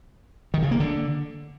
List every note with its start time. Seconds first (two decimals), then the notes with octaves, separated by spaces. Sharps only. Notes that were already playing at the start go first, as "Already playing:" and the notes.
0.54 D#3
0.63 C#3
0.71 A#3
0.80 D3